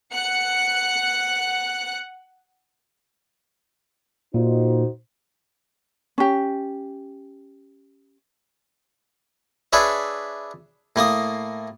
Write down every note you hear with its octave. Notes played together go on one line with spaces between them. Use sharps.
F#5 F#6 C#7
A#2 D#4 F#4 C5
C#4 G4
D4 G#4 B4 C#5 E5
A2 A#3 F5 D#6